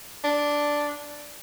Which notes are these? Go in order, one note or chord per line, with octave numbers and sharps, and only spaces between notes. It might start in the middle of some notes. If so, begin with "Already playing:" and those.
D4